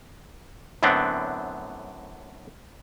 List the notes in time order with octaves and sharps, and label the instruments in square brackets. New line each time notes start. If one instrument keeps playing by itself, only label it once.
[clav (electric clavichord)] F#2 A2 D3 B3 C4 D4